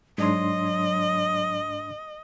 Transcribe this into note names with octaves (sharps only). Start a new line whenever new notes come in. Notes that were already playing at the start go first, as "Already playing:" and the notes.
G#2 F#3 D4 D#5 C6